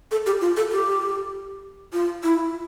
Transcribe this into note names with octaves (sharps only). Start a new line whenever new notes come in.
A4
G4
F4
A4
G4
F4
E4